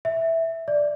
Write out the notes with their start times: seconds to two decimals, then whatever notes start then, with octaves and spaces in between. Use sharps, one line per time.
0.05 E5
0.68 D5